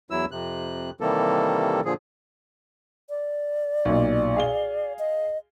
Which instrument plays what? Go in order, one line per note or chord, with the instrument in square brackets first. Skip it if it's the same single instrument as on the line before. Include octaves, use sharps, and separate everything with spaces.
[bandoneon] E2 F#3 E4 E6
F2 C3 F#6
C3 D#3 E3 G3 A#3 A4
A#2 D3 F3 G#4
[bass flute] D5
[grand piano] B1 A#2
G#4 F5 G7
[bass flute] D#5